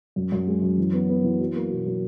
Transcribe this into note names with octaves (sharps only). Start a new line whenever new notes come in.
F#2
F#2
G#3
F#2
E3
B3
B3
E3
F#3
A#3
B2
F#3